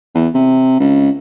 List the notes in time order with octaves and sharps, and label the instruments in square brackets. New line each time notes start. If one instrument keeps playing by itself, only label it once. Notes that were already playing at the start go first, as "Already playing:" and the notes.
[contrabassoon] E2
C3
C#2